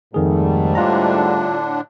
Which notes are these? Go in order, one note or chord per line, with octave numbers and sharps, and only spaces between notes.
F2 G#2 D#3 G3 A3 G#4
A2 D3 D4 F4 A#5